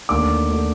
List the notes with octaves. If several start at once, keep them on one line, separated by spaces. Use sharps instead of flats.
D#2 D3 A3 D6
D3 A3